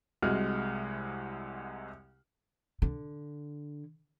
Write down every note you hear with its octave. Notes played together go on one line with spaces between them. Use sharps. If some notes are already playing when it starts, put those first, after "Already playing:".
C2 C3 G#3 F#4 F6
D3